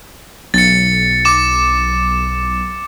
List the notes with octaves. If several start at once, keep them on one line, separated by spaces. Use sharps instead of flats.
B1 A6 C#7
D6 E7